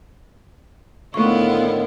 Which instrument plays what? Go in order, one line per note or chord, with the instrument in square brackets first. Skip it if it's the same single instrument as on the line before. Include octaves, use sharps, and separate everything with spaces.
[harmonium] A2 D3 D#3 [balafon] A3 C#6 [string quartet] B3 E4 F4